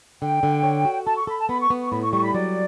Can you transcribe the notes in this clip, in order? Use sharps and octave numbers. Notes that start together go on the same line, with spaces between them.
D3 G5
D3
C#5
F#4
A4 A5
C#6
A4 B5
A5
B3 B5
C#6
B3
C#6
A2 B5
C#6
G3 C#6
B5
F#3 D5